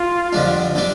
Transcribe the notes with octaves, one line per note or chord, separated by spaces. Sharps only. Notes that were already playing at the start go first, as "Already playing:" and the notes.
Already playing: F4
F2 D3 G3 D4
D3 G3 D4